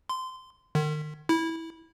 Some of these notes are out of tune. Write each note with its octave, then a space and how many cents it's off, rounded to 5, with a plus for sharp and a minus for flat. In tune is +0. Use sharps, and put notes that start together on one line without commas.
C6 -20
D#3 -40
E4 -15